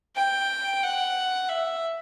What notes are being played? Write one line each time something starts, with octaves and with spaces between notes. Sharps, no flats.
G5
F#5
E5